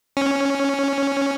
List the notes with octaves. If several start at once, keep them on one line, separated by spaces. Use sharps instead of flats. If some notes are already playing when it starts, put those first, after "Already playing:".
C#4